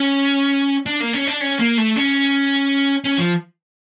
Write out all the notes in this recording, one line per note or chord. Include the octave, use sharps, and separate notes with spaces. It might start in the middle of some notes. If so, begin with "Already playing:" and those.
Already playing: C#4
D4
A#3
C#4
D4
C#4
A#3
A3
C#4
C#4
F3